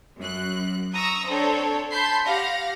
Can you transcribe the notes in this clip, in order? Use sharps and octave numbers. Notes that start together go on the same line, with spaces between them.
F#2 F#6
A#5 C#6 D#6 E6 A#6
C4 D4 A4 C#5
A5 B5 C6 G6 B6 C7
G4 F5 F#5 A#6